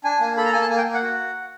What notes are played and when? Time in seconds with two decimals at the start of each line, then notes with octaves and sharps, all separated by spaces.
0.04 D4 G#5
0.20 A#3
0.37 A4 B5
0.45 A#5
0.53 A#3 G#5
0.61 A5
0.70 A#3 G#5
0.78 G5
0.86 A#3
0.94 F#5
1.02 F#4